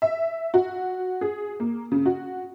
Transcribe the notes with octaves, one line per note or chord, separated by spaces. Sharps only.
E5
F#4
G#4
A#3
C#3
F#4